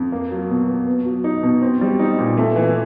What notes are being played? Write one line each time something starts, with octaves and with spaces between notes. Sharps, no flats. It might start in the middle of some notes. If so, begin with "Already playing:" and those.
Already playing: F2
A#3
F#3
B2
B2
B3
F#3
D#4
B2
C4
G3
D#4
A#2
A3
E3